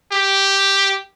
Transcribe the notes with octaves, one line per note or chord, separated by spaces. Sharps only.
G4